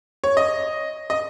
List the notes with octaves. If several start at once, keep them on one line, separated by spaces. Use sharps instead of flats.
C#5
D#5
D#5